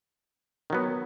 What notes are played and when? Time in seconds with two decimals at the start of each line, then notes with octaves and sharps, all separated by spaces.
0.70 D#3 F#3 B3